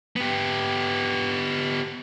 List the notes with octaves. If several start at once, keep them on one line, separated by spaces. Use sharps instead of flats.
B3 G4